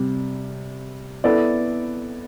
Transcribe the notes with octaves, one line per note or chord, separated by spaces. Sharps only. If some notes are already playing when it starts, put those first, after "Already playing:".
Already playing: C3 G3
B3 E4 A4 D5